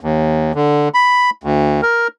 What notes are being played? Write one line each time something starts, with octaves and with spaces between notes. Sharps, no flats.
D#2
D3
B5
D2
A#4